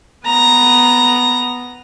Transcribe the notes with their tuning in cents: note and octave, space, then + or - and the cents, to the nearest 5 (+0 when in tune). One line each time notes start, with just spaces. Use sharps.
B3 +5 A#5 +0